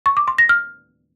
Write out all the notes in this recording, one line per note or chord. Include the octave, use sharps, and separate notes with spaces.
C#6
D6
C6
A#6
F6